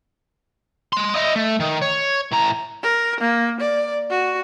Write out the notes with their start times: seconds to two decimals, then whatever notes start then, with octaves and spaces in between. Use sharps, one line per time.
0.93 D#5 C6
1.16 E4 D#5
1.36 A3
1.60 D#3
1.82 C#5
2.32 A2 A#5
2.83 A#4
3.21 A#3
3.61 D5
4.10 F#4